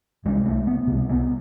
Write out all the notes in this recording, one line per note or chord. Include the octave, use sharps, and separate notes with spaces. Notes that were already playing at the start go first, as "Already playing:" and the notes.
C2 C3 G#3
A3
B3
C2 C3
B3